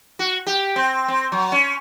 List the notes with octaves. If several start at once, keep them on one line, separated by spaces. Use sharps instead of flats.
F#4
G4
C4
C4
F#3
C#4